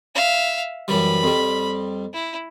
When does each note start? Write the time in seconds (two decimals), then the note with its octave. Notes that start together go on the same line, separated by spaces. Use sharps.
0.15 E5 F5
0.88 F#2 E3 G3 B5
1.23 F2 G3
2.14 E4